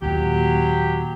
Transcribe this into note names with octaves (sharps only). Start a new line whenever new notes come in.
D#2 A#2 F#3 G4